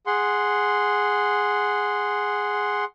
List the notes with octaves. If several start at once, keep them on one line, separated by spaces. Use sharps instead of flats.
G#4 F#5 C6